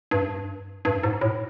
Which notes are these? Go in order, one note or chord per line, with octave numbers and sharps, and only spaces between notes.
G2
G2
G#2
A2